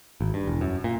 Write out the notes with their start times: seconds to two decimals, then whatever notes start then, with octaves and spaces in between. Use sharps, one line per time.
0.21 G#1
0.34 G2
0.47 E1
0.61 F#2
0.84 A#2